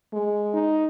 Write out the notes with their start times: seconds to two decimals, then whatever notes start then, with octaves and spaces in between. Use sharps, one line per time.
0.13 G#3
0.54 D#4